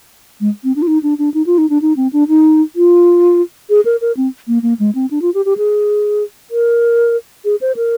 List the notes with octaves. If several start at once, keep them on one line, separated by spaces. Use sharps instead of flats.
G#3
C4
D4
F4
D#4
D4
D4
D#4
F4
D#4
D4
D#4
C4
D4
D#4
F4
G#4
A#4
A#4
C4
A#3
A#3
G#3
C4
D4
F4
G4
G4
G#4
A#4
G#4
C5
A#4